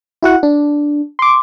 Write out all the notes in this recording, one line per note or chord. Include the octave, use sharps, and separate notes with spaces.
E4 F#4 F#5
D4
C6 D6